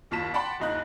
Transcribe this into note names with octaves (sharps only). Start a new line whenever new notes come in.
F#1 D#2 F4 A5 B6 E7
D5 F#5 G5 A5 B5 C6
F#1 C#2 D#4 D#5 F#6